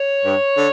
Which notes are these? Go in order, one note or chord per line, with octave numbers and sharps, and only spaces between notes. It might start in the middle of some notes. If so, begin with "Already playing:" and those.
Already playing: C#5
G2
D3